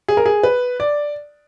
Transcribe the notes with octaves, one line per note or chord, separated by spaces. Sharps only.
G#4
A#4
G#4
B4
D5